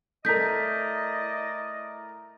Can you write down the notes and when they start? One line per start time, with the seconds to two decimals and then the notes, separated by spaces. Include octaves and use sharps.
0.25 A3 E4 A#4 D5 D#5 G6 B6